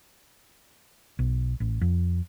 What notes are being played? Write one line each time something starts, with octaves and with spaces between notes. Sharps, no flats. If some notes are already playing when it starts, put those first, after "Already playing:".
B1
A1
F2